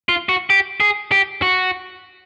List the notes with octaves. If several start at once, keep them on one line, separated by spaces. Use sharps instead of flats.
F4
F#4
G4
G#4
G4
F#4